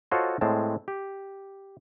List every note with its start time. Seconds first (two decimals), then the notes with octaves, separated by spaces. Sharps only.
0.11 F4 F#4 A4 C5 C#5 D#5
0.41 A2 G#3 C4 A5
0.88 G4